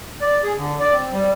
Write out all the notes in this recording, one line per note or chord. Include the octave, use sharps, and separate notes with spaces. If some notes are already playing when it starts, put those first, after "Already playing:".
D5
G#4
D3
D5
C4
G3